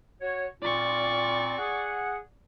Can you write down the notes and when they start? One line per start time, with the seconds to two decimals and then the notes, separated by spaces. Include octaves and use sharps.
0.21 F#4 C#5
0.62 A#2 C4 F4 D5 C#6
1.58 G#4 F#5